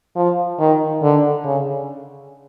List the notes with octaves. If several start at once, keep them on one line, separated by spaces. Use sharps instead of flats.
F3
D#3
D3
C#3